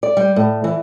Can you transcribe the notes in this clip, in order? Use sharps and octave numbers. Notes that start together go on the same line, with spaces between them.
D5
G3
A2
E3